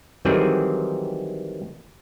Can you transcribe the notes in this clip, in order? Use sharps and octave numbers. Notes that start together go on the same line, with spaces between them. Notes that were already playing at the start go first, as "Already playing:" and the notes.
D#3 E3 F#3 G3 C4 G#4